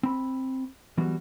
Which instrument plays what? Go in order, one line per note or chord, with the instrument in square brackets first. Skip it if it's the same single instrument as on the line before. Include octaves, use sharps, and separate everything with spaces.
[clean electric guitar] C4 B5
E3 F#3 G3 B3 F#4